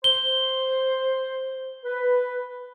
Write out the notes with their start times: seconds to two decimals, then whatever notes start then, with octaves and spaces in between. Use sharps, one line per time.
0.04 C5 G7
1.85 B4